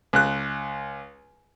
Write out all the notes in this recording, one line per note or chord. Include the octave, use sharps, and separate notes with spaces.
C#2 F#6